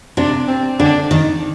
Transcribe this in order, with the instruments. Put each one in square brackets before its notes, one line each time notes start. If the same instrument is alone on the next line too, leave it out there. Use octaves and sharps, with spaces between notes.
[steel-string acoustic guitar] C3 [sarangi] D4
[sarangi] C4
[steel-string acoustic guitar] D3 [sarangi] D4
[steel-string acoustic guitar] D#3